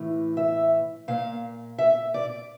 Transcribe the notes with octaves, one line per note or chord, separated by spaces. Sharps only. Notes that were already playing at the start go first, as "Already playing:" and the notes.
Already playing: A2 E3
E5
A#2 F5
E5
D5